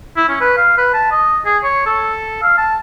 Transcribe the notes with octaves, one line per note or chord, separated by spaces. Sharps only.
E4
C#4
B4
F5
B4
A5
D#5
G#4
C#5
A4
F5
A5